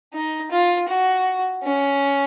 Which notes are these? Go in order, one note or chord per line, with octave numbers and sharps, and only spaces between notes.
D#4
F4
F#4
C#4